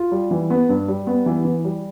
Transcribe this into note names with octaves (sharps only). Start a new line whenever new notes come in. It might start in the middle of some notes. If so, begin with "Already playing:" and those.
Already playing: F4
G3
E3
B3
G2
G3
B3
E3
E3
G3